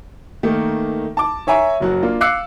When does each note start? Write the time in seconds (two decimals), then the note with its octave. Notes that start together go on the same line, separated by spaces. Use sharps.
0.43 D#3 A3 A#3 D#4
1.17 A5 D6
1.47 C#5 E5 G#5 A#5 C#6
1.80 F#1 F#3 F#4
2.03 A#3 D4 F4
2.21 F5 D6 E6 F#6 C7 C#7